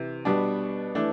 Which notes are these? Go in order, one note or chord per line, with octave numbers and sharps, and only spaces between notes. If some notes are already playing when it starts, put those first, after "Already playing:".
Already playing: C3 E3
B2 G3 B3 D4
E3 A3 D4